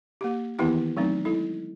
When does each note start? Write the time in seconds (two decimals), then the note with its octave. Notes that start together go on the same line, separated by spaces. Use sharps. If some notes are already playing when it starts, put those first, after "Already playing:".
0.21 A#3 G4
0.59 D#3 E3 B3 E4 G4 G5
0.97 F#3 A3 C4 D#4
1.25 G#3 E4 A4